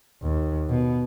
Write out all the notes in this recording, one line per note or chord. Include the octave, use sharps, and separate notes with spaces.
D#2
B2